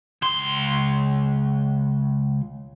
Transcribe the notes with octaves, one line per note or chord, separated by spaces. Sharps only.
C#2 C6